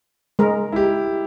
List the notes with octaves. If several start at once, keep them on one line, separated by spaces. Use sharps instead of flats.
G#3 A#4
E4 G4